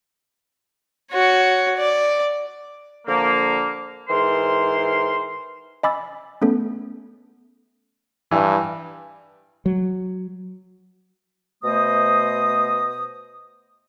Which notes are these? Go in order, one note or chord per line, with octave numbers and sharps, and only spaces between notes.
F#4 C#5
D5
D3 F3 A#3
G#2 E3 A#4 C5 C6
D#5 G#5 B5 D6 E6 A6
A3 B3 C#4 A4
G2 E3
F#3
B2 A3 C5 D#5 D#6